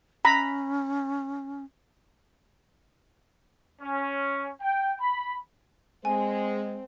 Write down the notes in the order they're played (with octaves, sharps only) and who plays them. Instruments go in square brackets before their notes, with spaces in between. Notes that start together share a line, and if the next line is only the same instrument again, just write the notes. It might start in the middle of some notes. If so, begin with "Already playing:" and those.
[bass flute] C#4 [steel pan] A#5 B5
[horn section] C#4
G5
B5
[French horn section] G#3 [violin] C4 [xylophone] G#5